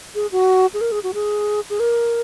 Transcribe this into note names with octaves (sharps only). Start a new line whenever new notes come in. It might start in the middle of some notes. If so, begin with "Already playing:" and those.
G#4
F#4
G#4
A#4
G#4
F#4
G#4
G#4
A#4